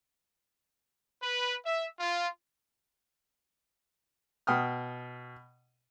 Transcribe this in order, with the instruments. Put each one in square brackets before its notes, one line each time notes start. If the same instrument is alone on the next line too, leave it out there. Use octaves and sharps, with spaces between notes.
[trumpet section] B4
E5
F4
[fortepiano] B2 G5 D#6 F6